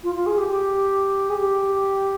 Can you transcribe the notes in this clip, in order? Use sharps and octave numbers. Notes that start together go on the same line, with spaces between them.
F4
F4
G#4
G4
G4
G#4
G4